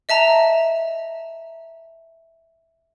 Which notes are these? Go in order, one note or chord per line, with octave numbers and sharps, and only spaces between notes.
D#5 E5 A5 A#5